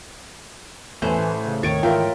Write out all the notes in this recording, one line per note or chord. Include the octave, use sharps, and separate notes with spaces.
A1 E2 E3 A3 C5 G#5
A2
C#3
D#2 A2 C3 D#3 C#5 C#6 A6 D7
G#2 E3 F4 A#4 E5 G5